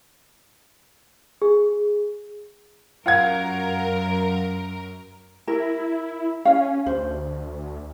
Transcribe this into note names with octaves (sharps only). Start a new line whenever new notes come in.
G#4
F#2 F4 A#4 F#5 G#6
E4 A#4
C#4 F5
D2 C5